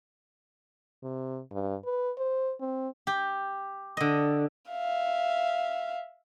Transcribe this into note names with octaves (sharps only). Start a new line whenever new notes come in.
C3
G2
B4
C5
C4
G4
D3 D#5
E5 F5